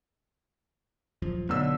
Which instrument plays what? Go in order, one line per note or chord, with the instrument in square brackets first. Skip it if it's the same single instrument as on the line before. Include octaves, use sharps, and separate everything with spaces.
[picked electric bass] D#1 F#2 F3
[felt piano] B1 D3 E6 [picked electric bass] B3